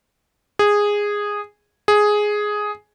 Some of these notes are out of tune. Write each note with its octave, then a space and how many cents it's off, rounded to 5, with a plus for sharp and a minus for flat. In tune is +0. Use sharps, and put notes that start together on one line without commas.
G#4 -10
G#4 +5